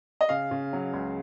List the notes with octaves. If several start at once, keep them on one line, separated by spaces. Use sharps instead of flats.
D#5
C#3 F5
C#3
F#3
C#2